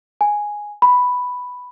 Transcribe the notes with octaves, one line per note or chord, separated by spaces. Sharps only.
G#5
B5